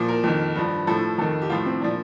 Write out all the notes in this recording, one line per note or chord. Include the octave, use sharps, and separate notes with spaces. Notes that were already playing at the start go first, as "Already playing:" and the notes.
Already playing: A#2 F3
A#4
F2 D#3
G2 F3
A2 F3 A4
F2 D#3 A4
G4
A2 F3 F4
C4
A#2 F3 D4